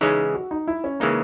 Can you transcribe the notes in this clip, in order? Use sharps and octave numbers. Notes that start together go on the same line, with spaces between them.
C#3 E3 G#3 C#4 D#4
F#4
D#4
E4
C#4
C#3 E3 G#3 A#3 D#4